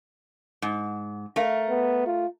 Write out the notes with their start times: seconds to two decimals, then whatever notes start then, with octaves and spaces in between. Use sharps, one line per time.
0.62 G#2
1.36 A3 A#4 F5
1.69 B3
2.07 F4